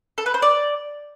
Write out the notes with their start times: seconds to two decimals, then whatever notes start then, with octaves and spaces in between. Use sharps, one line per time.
0.18 A4
0.26 B4
0.34 C5
0.42 D5